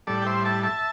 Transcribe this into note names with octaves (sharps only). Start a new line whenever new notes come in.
A2 G3 A4 D5
G5
C5 E5
E5 A5
E5 A5